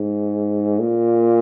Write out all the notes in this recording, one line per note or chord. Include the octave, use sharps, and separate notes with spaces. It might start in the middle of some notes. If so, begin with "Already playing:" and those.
Already playing: G#2
A#2